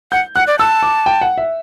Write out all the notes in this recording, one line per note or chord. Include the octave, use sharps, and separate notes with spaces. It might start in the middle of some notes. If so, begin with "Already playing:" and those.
F#5 G6
F#5 F#6
D5
A5 E6
D6
G5
F#5
E5